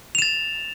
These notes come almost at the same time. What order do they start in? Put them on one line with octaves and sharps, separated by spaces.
F7 E7 A6